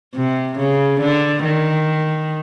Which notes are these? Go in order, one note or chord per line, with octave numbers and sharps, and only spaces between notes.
C3
C#3
D3
D#3